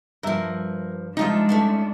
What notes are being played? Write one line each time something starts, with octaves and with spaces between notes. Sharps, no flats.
G2 F3 A#4 E5
G2 F3 G#3 D4 D#4 F4 E5
A3 C#4 E5